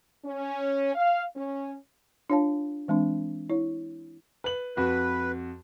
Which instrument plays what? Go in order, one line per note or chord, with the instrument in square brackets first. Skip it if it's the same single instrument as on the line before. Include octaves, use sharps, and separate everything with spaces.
[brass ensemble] C#4
F5
C#4
[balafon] D4 F4 C#5 F5 A5
E3 G#3 C4 D4
E4 C#5
[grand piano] B4 F#7
[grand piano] F2 F#4 [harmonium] B4